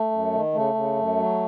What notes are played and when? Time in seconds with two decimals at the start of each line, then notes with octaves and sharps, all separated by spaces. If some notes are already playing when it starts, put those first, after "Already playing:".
Already playing: A3
0.11 F#2
0.32 D#3
0.54 C#3 A3
0.74 C#3
0.96 F#2
1.17 F#3